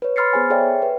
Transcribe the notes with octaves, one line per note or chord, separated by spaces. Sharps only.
B4 C#5
B5 C6 F6 A6 C7 C#7
B3 G#4 C5 G#5
G#4 A4 C#5 D5 E5 G5
B4